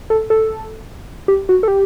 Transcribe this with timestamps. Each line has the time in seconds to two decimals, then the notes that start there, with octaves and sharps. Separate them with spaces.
0.10 A4
0.30 A4
1.28 G4
1.49 F#4
1.63 A4
1.68 G4